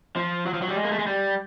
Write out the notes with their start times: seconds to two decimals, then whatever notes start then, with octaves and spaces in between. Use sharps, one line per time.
0.16 F3
0.46 F#3
0.54 F3
0.62 F#3
0.68 G3
0.76 G#3
0.84 A#3
0.92 A3
0.99 G#3
1.07 G3